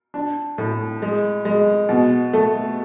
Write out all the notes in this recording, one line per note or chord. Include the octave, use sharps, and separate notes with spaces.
D4
A2
G#3
G#3
B2
A3